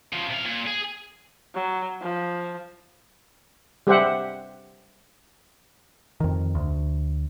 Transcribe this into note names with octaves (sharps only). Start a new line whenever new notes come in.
C#3 F3
C3 F5
A#2
G#4
F#3
F3
G3 G4 G#4 C5 E5 F#5
F2 D#3
D2